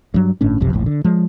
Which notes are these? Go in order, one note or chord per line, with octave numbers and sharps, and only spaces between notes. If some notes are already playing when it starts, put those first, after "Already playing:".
G2 F#3
G1 A2 C#4 D4
F#1 B1 F2 C3
E1 A#1 A2
D3
F3 G#3